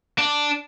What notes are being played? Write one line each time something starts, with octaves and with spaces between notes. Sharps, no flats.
D4